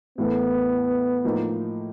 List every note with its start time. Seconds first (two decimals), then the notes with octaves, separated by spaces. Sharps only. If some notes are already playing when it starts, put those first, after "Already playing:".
0.18 A2 E3 A3 B3
1.24 A2 F3 A#3 D#4